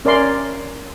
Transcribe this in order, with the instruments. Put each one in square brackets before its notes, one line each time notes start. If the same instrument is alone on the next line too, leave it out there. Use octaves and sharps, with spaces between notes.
[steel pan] C#4 A#4 D5 E5 C6